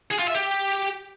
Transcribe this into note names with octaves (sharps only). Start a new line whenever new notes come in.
G#4
F4
E5
G4